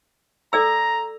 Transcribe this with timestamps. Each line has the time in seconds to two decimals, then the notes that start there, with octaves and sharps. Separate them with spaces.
0.53 A4 D5 A#5 E6